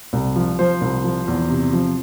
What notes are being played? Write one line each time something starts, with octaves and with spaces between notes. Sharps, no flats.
C2
F3
F3 C5
C2
F3
E2
C3
F3